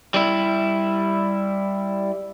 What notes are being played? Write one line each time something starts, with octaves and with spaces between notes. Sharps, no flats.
G3 E4